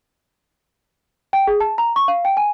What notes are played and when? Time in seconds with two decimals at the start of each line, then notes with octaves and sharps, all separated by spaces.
1.33 G5
1.47 G#4
1.60 A5
1.78 A#5
1.96 C#6
2.08 F5
2.25 G5
2.37 G#5